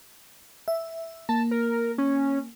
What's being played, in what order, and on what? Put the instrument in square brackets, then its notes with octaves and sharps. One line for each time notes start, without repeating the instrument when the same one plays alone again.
[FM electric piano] E5
[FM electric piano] A#3 [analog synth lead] A5
[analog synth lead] A#4
C#4